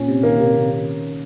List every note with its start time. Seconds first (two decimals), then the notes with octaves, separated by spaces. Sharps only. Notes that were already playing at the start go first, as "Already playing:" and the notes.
Already playing: A#2 C#4
0.08 C3
0.23 D#3 A#3
0.40 C3
0.55 C3